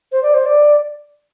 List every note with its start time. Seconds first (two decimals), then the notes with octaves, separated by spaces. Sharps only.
0.12 C5
0.23 D5
0.34 C5
0.46 D5